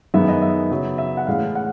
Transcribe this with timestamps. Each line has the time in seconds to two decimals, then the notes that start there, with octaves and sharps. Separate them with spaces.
0.14 F#2 D#3 G#3 B3 E5
0.28 D#5
0.42 E5
0.71 C#3 F#3 B3
0.98 E5
1.17 F#5
1.27 A2 E3 G#3 F5
1.55 F#5